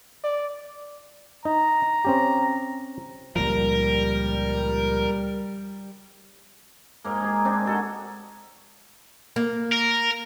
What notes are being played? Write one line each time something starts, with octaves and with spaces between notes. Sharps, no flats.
D5
D#4 A#5
C4 C#4 G4
C#2 A#2 F3 G3 A#4
G#2 A#3
D#4 G#4
C4 D4 D#4
F#4 A4 D#5 F#5
A#3
A#4